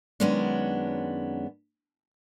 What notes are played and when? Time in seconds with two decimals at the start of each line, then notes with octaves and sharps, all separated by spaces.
0.20 F#2 D#3 G#3 B3 C#4 D4